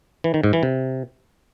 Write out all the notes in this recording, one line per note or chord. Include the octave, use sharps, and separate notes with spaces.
E3
D#3
G#2
E3
C3